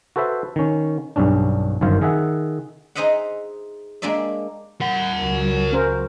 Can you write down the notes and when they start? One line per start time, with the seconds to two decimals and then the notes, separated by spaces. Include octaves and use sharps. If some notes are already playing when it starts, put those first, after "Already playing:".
0.16 F#4 A4 B4 C5 E5
0.56 D#3 C#4
1.16 B1 G2 C#4 D4
1.81 G1 F#2 D#3 C5 F5
2.01 D#3 G#4 E5 F#5
2.95 D#4 G#4 C5 D#5 E5 F#5
4.02 G#3 A#3 D4 D5 E5
4.81 A#4 F#5
5.20 C#2 F#3
5.73 C#4 A#4 C5